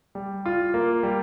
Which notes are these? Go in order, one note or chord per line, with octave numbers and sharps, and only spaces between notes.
G3
F4
A#3
G3